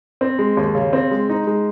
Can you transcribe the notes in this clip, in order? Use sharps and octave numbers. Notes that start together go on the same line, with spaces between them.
C4
G#3
D#2
C#3
C4
G#3
D#4
G#3